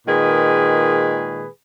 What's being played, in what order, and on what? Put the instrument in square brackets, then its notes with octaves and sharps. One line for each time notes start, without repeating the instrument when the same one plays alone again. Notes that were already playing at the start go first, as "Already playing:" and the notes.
[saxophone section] A#2 D#3 G#3 G#4 B4